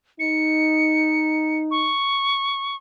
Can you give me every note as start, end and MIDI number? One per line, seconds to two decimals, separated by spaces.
0.20 1.92 63
0.20 1.59 97
1.71 2.76 85